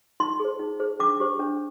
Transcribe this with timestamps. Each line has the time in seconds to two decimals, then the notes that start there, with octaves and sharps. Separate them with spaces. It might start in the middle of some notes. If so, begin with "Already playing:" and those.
0.20 D#4 C6
0.40 G#4 C5
0.59 D#4
0.80 G#4 C5
0.99 D4 D6
1.20 G4 C5
1.39 D4